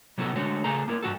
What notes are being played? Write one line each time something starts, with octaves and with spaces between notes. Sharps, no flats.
C3 F#3 B3 E4 F#4 A4
D3 G#3 A3 F#4 C#5
C#3 A3 G#4 A4 A#5
A#3 E4 A#4
G2 E3 F#4 A4